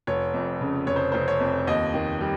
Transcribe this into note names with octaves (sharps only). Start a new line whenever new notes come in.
F1 C#5
F2
C#3
F1 C#5
C5
F1 C5
C#5
F2
D#2 D#5
D#3
G3